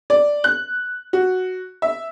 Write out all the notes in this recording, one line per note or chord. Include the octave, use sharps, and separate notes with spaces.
D5
F#6
F#4
E5